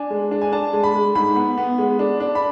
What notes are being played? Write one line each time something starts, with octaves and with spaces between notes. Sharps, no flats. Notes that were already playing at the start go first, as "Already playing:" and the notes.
Already playing: D4 G#5
G#3
D4
G#5
D4 A5
G#3
B5
G#3
G#2 B5
B3
B3
G#3
D4
D4
B5